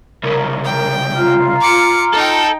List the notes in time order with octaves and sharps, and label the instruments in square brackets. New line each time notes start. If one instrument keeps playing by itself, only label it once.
[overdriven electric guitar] C2 C#3 [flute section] A#4
[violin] G5
[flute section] F4 A#5 F6
[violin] D6 C#7
[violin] D#4 G5 [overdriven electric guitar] A4